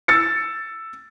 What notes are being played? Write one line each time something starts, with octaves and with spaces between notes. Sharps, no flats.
E6 A6 C#7